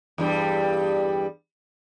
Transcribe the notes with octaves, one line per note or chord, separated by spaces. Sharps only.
E2 G2 G3